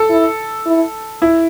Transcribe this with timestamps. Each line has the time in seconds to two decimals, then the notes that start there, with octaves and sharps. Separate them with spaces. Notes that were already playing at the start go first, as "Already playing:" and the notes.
Already playing: A4
0.10 E4
0.66 E4
1.22 E4